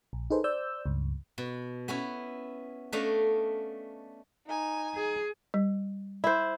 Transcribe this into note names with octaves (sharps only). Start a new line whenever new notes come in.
A#1
D#4 G#4 A4 B4 C5
C5 D5 E6 G6
C#2 G2
B2
B3 C#4 E4
A3 C#4 D4 D#5 F5
D#4 G#5
G#4
G3
E4 C5